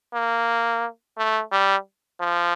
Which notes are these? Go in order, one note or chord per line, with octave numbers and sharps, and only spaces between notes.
A#3
A3
G3
F3